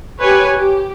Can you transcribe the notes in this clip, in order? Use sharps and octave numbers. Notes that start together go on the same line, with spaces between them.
G4 B4 C#5 G#5
G4